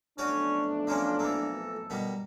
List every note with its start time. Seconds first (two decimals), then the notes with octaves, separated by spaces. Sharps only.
0.18 B1 F2 A3 C#4 D4 F#4 C#5 D5
0.87 F3 A#3 C#4 F4
1.19 E3 A#3 A4
1.90 B2 D#3 G3